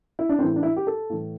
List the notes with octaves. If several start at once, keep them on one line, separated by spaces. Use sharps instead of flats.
E4
D4
A2 E3 C4
D4
E4
G4
A4
A2 E3